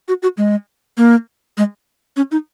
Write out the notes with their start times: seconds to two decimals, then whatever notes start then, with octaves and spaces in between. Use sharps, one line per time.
0.08 F#4
0.22 F#4
0.37 G#3
0.97 A#3
1.57 G#3
2.17 C#4
2.32 D#4